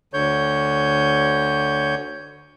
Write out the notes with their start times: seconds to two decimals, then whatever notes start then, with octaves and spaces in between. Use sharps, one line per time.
0.13 D2 D3 C#5 G6